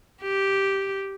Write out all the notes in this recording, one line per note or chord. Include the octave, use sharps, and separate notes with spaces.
G4